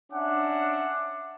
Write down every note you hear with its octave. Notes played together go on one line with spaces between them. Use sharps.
C#4 D4 E5 F#5 D6